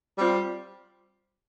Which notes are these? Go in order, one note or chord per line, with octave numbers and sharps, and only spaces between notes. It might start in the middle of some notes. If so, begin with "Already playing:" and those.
G3 C4 F4